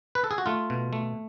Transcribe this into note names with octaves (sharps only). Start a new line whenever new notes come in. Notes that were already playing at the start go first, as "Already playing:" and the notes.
B4
A4
G#4
F#4
A3 F4
B2
A3